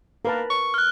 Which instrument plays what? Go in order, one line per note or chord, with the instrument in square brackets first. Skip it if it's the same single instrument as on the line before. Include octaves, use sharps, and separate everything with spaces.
[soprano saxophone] A#3 [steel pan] A#4 B4 A5
[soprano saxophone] C#6
[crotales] F6 F#6